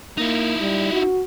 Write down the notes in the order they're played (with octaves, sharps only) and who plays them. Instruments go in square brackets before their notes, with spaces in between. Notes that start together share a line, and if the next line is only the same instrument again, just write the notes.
[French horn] A#3 [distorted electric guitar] D#4 E4
[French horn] G3
F#4